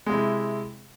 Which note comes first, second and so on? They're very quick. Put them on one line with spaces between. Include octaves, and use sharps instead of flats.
G#3 C3 E4